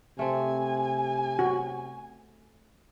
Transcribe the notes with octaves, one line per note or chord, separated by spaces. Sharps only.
C3 A3 C4 G#5
F#4